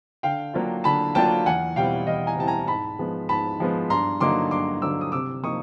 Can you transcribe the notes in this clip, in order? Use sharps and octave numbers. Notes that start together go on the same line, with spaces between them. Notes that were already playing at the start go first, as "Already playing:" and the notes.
D3 F5 G5
F#3 A#3 D4 F4
D3 A5 B5
F#3 A#3 D4 F4 G5 A5
E2 F#5 G#5
B2 G3 C4 E4 F5 G5
E2 D#5 F5
G#5 A#5
B2 G3 C4 E4 A5
G#5 A#5
G#2 A5 B5
F3 G#3 B3
G#2 A5 B5
F3 G#3 B3
G2 A#5 C6
D3 F#3 A#3 D#4 C6 D6
G2 C6 D6
D3 F#3 A#3 D#4 D6 E6
D#6
C3 D6 E6
F3 A#3 D#4 C#6 D#6